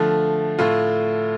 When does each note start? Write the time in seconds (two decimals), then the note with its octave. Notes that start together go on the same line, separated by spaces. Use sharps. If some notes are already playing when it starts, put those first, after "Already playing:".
Already playing: D3 F3 A3
0.59 A2 A3 F4